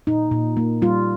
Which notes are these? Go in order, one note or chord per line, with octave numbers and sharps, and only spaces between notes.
A#2 D#4
A#2
A#3
G3 F4